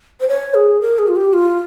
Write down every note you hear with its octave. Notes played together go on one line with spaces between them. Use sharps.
C5
C#5
G#4
A#4
G#4
F4
G4
F4